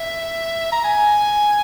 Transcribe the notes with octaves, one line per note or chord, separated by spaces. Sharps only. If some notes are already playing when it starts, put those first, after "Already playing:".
Already playing: E5
A#5
G#5